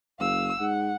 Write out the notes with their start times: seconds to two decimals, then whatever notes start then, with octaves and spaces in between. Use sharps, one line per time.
0.20 F#1 F5 E6
0.60 G#2 F#5